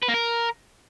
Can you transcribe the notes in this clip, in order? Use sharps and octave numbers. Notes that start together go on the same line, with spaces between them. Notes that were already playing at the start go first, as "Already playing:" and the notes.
B4
A#3
A#4